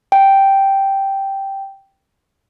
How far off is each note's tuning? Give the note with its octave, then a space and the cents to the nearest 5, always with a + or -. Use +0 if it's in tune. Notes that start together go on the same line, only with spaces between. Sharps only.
G5 -5